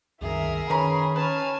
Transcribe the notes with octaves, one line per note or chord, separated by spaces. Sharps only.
C2 F#2 D#3 G#4 A#4 E5
D#3 C#4 B4 A#5 B5
C#4 B4 G#5 A5 F6